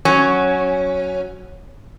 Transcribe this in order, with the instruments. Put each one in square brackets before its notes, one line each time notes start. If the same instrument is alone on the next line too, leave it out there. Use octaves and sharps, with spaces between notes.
[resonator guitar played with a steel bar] F#3 C#4